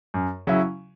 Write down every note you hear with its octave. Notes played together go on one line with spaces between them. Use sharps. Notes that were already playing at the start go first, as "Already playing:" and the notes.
F#2
C#3 F#3 C#4 E4